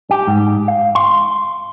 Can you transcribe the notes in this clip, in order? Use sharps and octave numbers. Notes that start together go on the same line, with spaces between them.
G4
G#2
F5
C6